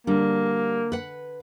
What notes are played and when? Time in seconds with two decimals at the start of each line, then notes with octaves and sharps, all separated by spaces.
0.07 D3 G3 A#3
0.92 B4 F#5